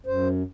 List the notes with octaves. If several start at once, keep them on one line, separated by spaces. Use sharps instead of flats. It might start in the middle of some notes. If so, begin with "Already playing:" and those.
F#2 C5